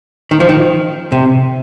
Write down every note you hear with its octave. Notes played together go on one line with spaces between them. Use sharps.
D#3
F3
D#3
C3